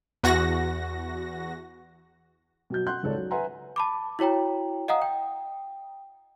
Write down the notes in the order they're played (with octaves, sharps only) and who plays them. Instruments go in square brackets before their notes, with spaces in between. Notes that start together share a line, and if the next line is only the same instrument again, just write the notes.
[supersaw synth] E2 F#4 A#6
[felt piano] B2 F#3 G6
F#5 C6 F#6 G6
G#1 C#2 A4 C#5 D5
F#3
B4 E5 F#5 G#5 A#5 C6
[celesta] A5 B5 D6
E4 F#4 C#5 G5 A#5
D#5 F5 F#5 A#5 D#6
G5